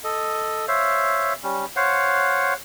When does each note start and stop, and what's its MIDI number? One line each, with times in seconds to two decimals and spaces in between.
0.04 0.66 69
0.04 0.66 75
0.68 1.33 72
0.68 1.33 73
0.68 1.33 76
0.68 1.33 77
1.43 1.66 55
1.43 1.66 61
1.76 2.54 72
1.76 2.54 73
1.76 2.54 77
1.76 2.54 78